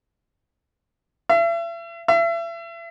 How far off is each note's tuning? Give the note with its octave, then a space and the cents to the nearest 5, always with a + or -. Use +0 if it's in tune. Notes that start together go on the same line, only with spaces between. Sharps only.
E5 +40
E5 +35